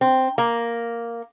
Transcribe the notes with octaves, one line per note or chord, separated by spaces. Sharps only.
C4
A#3